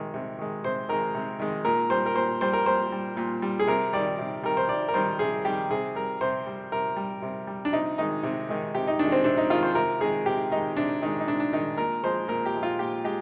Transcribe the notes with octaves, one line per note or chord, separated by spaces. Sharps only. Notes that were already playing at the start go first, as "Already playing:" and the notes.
Already playing: C3 D#3 G#3
C3
D#3 G#3
C3 C5
D#3 G#3 A#4
C3
D#3 G#3
A#2 A#4
G3 C5
A#4
A#2 C5
G3 C5
A#4
A#2 C5
G3
A#2
G3
G#4
C3 A#4
D#3 G3 D5
C3
D#3 G3 A#4
C5
C3 D5
A#4
D#3 G3 C5
C3 G#4
D#3 G3 G4
C3 G#4
G3 A#4
C3 C5
G3
C3 A#4
G3
C3
G3
D4
C3 D#4
D#3 G#3 D#4
C3
D#3 G#3
C3 G4
D#4
D#3 G#3 D4
C4
C3 D4
D#4
D#3 G#3 F4
C5
C3 A#4
D#3 G#3 G#4
C3 G4
D#3 G#3 D#4
C3 D4
D#3 G#3 D#4
D#4
C3 D4
D4
D#3 G#3 D#4
A#2 A#4
F3 G#3 C5
A#2 A#4
G4
F3 G#3
F4
A#2 G4
G#3 G4